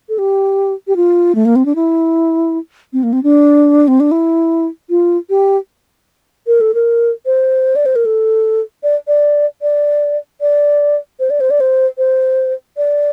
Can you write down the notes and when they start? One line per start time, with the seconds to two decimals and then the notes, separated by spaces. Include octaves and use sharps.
0.09 A4
0.18 G4
0.87 G4
0.96 F4
1.35 A3
1.45 A#3
1.56 C4
1.65 D4
1.75 E4
2.93 C4
3.03 A#3
3.13 C4
3.23 D4
3.88 C4
4.00 D4
4.11 E4
4.90 F4
5.30 G4
6.47 A#4
6.61 A4
6.74 A#4
7.26 C5
7.76 D5
7.86 C5
7.95 A#4
8.05 A4
8.83 D5
9.07 D5
9.62 D5
10.41 D5
11.20 C5
11.30 D5
11.40 C5
11.50 D5
11.60 C5
11.98 C5
12.77 D5